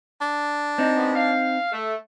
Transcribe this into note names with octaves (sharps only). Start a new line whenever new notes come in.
D4
C4 D#4
G#3 B3
F5
A3